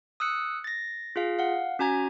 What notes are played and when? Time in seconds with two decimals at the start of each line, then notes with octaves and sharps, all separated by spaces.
0.20 D#6 E6 F#6 C#7
0.64 A6 A#6
1.16 F4 G#4 F5
1.39 F5 F#5
1.79 C#4 F#4 G#5 A#5 G#6